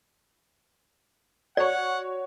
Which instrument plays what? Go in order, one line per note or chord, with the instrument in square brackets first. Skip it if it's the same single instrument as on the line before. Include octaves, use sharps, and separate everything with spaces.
[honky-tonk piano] F#4 C#5 [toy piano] D5 [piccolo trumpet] F#5